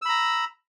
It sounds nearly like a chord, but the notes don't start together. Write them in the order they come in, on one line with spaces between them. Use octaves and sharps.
E6 B5 A#5